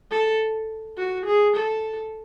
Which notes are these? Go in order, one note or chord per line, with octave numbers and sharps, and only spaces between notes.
A4
F#4
G#4
A4